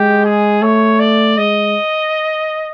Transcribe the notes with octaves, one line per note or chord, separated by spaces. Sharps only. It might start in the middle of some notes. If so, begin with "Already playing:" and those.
Already playing: G#3 G4
G#4
A3 C#5
D5
G#3 D#5